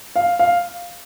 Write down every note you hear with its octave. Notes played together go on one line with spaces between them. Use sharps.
F5
F5